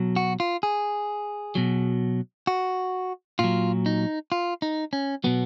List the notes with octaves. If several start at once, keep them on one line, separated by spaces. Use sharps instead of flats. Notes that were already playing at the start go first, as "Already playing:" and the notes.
Already playing: B2 F#3
F#4
F4
G#4
B2 F#3
F#4
A#2 F#3 F4
D#4
F4
D#4
C#4
B2 F#3 B3